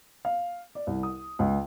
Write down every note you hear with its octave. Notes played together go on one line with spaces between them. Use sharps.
F5
D5
C2
D#6
C#2